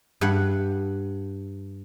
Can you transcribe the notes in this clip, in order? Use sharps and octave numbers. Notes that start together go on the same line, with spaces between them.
G2 F#5